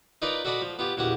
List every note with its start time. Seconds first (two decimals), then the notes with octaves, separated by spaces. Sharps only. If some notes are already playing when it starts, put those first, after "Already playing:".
0.22 D#4 F4 A#4 B4 D5
0.45 F#4 A4 D5 D#5 B5
0.62 F3
0.79 B3 F4 G4
0.97 A#1 E2 F#4 G4 F#5